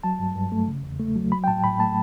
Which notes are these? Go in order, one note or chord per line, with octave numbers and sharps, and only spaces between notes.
F#3 A5
G2
G2
A3
C#3
E2
A3
F#3
F#3 B5
G5
A2 A5
A2 B5
A3 A5